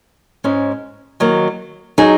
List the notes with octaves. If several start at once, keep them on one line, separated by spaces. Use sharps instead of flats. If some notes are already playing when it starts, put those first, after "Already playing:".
G#2 G#3 C#4
D#3 F#3 A#3
F#3 D#4 G#4